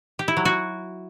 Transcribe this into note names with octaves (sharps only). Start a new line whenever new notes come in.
G4
E4
F#3
F#4